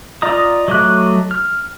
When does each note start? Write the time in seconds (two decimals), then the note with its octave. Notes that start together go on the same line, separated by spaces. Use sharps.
0.22 F4 D5 D#5 A#5 D#6
0.68 F#3 A3 D#5 D6 F#6
1.31 F6